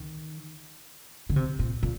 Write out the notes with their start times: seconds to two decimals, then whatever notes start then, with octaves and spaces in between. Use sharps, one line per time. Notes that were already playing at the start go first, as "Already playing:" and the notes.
Already playing: D#3
1.29 D3
1.36 C3
1.59 A#2
1.83 A#2